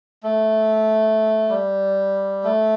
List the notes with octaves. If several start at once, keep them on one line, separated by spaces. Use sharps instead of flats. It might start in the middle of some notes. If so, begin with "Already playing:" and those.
A3
G3
A3